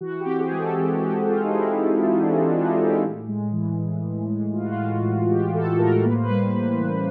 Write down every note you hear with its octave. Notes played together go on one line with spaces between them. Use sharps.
E3 F#4
G4
C4
G#4
G#3 G#4
A4
E3 G4
G4
E3 F#4
C4 F4
D#4
G#3 E4
E3
E3
D4
C4 D#4
D4
G#3
D4
D#4
E3
G4
A2
G#3
E3
A2
A2
G#3
E3 F4
F#4
F4
A2
A2
G#3 G4
E3 A4
A2 A#4
A#3 B4
C5
B4
G3
E3
C#3